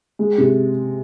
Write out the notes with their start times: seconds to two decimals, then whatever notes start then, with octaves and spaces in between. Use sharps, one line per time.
0.19 G#3
0.38 C3